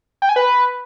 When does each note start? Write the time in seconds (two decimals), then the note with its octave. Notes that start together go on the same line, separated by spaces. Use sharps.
0.22 G5
0.29 G#5
0.36 B4